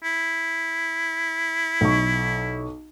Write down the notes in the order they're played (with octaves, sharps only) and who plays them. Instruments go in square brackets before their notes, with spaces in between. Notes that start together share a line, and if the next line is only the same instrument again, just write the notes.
[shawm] E4
[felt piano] B1 C#6